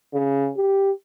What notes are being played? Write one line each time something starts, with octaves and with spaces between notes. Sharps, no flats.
C#3
G4